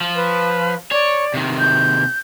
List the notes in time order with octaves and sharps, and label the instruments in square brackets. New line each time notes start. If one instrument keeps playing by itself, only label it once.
[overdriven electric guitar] F3
[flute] B4
[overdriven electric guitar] C#5 [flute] D5
[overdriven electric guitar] C3 D#3
[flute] G6